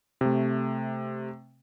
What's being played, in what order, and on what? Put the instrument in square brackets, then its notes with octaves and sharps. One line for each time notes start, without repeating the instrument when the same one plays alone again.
[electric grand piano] C3 A3